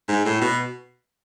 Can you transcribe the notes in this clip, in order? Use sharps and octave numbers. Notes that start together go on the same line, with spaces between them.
G#2
A2
B2